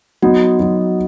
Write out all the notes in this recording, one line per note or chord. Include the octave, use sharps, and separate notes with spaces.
F#3 B3 D#4 F#4
F#3 B3 D#4